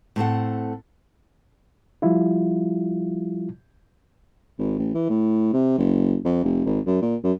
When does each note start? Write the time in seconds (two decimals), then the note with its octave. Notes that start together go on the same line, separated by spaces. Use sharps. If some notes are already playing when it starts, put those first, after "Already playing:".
0.16 A2 C4 A4 F#5
2.02 F3 G3 E4 F4
4.59 G#1
4.79 A1
4.95 E3
5.10 A2
5.53 C3
5.78 F#1
6.25 F2
6.44 F1
6.66 G#1
6.87 F#2
7.02 A#2
7.24 F#2